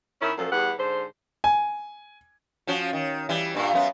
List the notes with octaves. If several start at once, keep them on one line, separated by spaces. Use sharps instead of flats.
D#3 C#4 E4
F#2 A#2 F3 A4
E2 G3 B4 F#5
G#2 D3 C5
G#5
F3 C#4 F#4
D#3
E3 G3
G2 A#2
F#2 B3